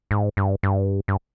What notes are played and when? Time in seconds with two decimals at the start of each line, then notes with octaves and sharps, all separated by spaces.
0.11 G#2
0.37 G2
0.63 G2
1.08 G2